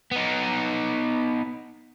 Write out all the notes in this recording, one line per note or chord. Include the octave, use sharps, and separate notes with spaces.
B3 D#4